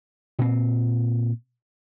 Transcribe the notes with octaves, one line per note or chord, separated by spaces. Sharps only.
A#2 C4